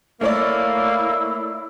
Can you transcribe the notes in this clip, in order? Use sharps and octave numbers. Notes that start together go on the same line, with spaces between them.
A3 A#3 E4 C#5 D5